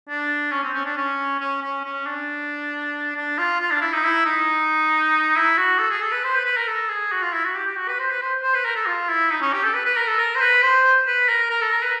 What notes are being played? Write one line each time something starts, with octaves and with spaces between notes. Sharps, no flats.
D4
C#4
C4
C#4
D4
C#4
C#4
C#4
C#4
D4
D4
F4
F4
D4
E4
D#4
E4
D#4
E4
F#4
A4
G#4
A4
B4
C5
B4
B4
A#4
A4
G#4
F#4
F4
E4
F#4
G4
G4
F#4
B4
C5
B4
C5
C5
B4
A#4
A4
F4
E4
D#4
C#4
G4
A4
B4
B4
A#4
A4
A#4
C5
B4
C5
B4
A#4
A#4
A4
A#4
B4